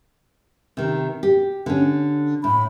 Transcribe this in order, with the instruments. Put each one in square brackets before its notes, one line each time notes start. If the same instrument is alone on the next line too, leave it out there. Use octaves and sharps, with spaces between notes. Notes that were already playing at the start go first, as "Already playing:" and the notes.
[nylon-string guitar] C3 D#3
G4
D3 C#4
[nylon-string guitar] A2 [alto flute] B5